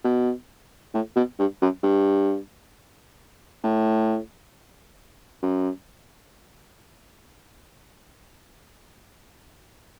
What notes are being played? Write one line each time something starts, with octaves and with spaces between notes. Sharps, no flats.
B2
A2
B2
G2
F#2
G2
A2
F#2